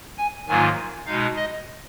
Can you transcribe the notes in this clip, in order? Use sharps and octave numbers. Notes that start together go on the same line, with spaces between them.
G#5
G#2 D#3 F#3 A#3 F4 G#5
B2 G#3 D#4 F5
D#5